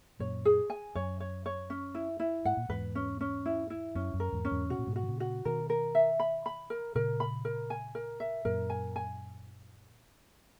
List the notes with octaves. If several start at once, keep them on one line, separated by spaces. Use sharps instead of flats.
F#2 A#2 C#5
G#4
G#5
F#2 C#5
C#5
C#5
C#4
E4
E4
G#2 F#5
A#2
E2 G#2 B4
C#4
C#4
E4
E4
F#2 C#4
F#2
A#4
E2 G#2
C#4
E2 G#2
B2 F#4
A#2
G#2 B2
F#4
D#3
A#2 C#3
F#4
B2 D#3 A#4
A#4
E5
B5
B5
A#4
A#2 C#3 A#4
B5
A#4
G#5
A#4
E5
F#2 A#2 A#4
G#5
G#5